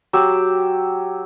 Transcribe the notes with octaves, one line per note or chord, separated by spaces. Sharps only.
F#3 G4 E6